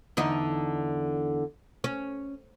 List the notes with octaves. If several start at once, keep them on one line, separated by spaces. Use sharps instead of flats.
E2 D3 D#4
C#4